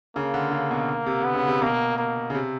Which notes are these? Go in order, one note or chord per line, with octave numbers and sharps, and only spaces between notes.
C#3 A#3
D3
C#3
B2
C3
D3 B3
C#3
C3
B2 A#3
A#3
C#3
C3